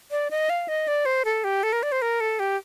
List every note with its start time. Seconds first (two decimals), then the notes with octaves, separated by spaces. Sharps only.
0.11 D5
0.31 D#5
0.50 F5
0.68 D#5
0.88 D5
1.06 C5
1.25 A4
1.44 G4
1.63 A4
1.73 A#4
1.83 D5
1.92 C5
2.02 A#4
2.20 A4
2.39 G4